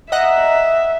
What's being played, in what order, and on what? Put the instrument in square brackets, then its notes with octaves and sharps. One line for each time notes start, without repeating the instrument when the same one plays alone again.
[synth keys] D#5 F#5 A#5 [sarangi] E5